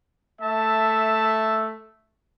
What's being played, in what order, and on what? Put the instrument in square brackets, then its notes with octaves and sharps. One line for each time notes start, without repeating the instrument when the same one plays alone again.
[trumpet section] A3 E5 A5